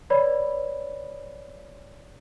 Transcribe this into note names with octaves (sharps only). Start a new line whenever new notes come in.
B4 C#5 D5 B5